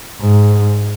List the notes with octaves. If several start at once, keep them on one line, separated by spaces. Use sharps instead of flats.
G#2